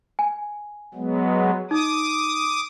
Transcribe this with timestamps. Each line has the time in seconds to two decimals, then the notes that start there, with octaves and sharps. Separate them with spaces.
0.19 G#5
0.94 F#3 G#3 B3
1.71 D#4 D6 D#6